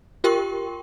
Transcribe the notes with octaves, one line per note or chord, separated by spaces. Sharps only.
F4 G4 A#4 G5 C6 C#6